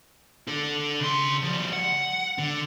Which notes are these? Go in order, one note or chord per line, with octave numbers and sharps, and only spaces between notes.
D4 A4
C#3 C6
F3 G3
F#5
D3